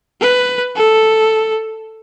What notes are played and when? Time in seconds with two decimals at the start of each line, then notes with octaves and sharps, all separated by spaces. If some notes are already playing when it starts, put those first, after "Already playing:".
0.21 B4
0.76 A4